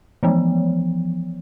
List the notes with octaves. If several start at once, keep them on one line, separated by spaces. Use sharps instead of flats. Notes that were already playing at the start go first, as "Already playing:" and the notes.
E3 F3 B3